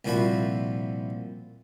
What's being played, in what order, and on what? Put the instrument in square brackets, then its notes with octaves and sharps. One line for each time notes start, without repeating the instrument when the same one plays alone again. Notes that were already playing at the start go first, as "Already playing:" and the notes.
[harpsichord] C2 A#2 F3 F#4 E5 B5